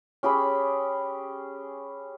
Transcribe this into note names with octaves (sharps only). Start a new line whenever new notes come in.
C#4 G4 G#4 B5